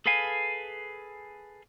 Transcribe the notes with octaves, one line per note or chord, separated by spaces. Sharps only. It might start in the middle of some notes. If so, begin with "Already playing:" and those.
G#4 A4 B4 F5 G#5